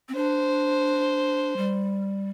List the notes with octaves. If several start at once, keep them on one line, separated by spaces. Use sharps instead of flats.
C4
D4 C5
G3